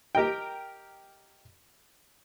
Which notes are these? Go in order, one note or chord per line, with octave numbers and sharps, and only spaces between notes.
G4 A#4 D#5 G5